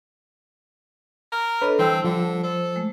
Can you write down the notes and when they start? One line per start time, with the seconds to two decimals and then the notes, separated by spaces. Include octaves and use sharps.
1.32 A#4
1.62 D4 A4 B4 C#5 D#5
1.79 E3 G3 C4 C5 G5 A5 E6
2.04 D3 F3
2.44 A4 C5
2.76 G#3 A3